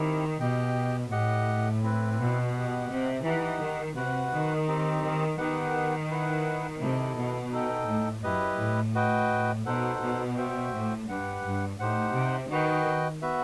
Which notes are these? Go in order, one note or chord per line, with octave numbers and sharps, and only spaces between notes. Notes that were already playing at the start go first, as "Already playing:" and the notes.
Already playing: D#3 C4 E4 G4
B2 G4 D#5 G5
A2 G4 D#5 F#5
C4 E4 B4
B2
G4 D#5 F#5
C3
E3 D#4 G4 D#5 F#5
D#3
C3 F#4 B4 F#5
D#3
C4 D#4 G4
D#3
D#3 B3 D#4 G4 B4 F#5
E4 B4 F#5
C3 E4 A4 D#5
B2
D#4 A4 D#5 G5
A2
F#2 E4 G4 B4 D#5
A2
F#4 B4 D#5 G5
B2 D#4 A4 C5 F#5
B2
F#4 C5 E5 G5
A2
G2 G4 B4 F#5
G2
A2 D#4 G4 C5 F#5
C3
D#3 F#4 B4 D#5 G5
B3 F#4 B4 E5